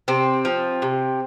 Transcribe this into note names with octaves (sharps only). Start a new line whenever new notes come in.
C3 C4
F3
C3